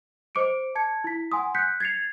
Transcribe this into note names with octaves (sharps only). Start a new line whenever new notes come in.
C5 D#5 D6 C#7 D7
A5 G#6 C#7
E4 B6
F#5 G#5 C6 D#6
F#6 G6 B6 C#7
G#6 A6 C7 C#7 F7